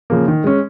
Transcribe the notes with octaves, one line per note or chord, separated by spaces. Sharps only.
C#3 F3 A#3
D#3
G#3 C#4